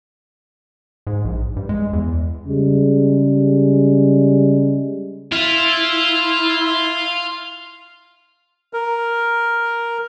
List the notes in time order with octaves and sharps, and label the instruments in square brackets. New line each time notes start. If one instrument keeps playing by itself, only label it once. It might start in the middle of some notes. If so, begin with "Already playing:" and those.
[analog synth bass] G#2
A#1
G2
G#3
E2
[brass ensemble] C#3 G3 G#3
[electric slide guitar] E4 [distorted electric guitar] F4
[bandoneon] A#4